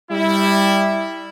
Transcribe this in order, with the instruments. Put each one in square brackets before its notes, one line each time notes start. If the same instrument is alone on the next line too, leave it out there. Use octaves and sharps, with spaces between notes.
[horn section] G3 E4